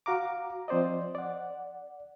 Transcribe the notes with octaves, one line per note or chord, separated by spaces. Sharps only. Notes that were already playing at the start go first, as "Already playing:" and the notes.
F#4 F5 A#5 D6
F3 C4 C5 D5 D#5
D5 F#5